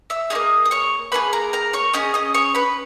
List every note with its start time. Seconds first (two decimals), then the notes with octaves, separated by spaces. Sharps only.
0.10 E5 E6
0.30 C#4 G#4 D#5 D#6
0.35 A#3
0.65 D#6
0.71 C#5 C#6
1.12 A#3 E4 G#4 B4 B5
1.33 A#4 A#5
1.53 A#4 A#5
1.73 C#5 C#6
1.93 C#4 G#4 D#5 D#6
2.14 D#5 D#6
2.34 C#5 C#6
2.55 B4 B5